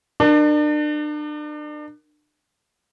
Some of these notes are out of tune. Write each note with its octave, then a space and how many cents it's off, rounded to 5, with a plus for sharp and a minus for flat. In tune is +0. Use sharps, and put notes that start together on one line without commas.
D4 +35 A#4 +0